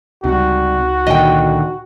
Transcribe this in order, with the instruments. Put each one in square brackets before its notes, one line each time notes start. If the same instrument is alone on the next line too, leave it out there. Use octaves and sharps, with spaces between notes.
[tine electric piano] C#2 D#4 [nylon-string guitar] C3 G3 [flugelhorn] F#4
[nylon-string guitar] A#2 D3 D#3 [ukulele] D#5 G5